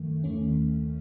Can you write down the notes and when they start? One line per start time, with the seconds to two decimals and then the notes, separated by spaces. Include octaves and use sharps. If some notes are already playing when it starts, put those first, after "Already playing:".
Already playing: F#2 D#3 A3
0.24 D#2 D#3 A3 C#4